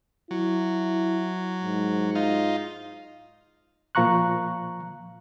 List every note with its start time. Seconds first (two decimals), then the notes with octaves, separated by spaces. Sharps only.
0.31 F#3 E4
1.63 G#2
2.15 D#4 F4
3.95 A#2 F3 F5 A#5 C#6 F#6